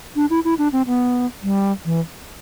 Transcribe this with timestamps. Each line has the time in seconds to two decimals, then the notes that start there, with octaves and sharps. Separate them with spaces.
0.16 D4
0.30 E4
0.45 E4
0.58 D4
0.73 C4
0.87 B3
1.43 G3
1.85 E3